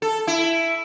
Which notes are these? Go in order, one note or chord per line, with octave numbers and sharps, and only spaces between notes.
A4
E4